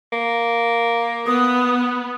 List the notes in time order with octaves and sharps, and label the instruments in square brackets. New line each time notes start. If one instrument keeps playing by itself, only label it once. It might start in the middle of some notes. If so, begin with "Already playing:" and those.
[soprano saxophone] A#3
[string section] B3 [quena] D#6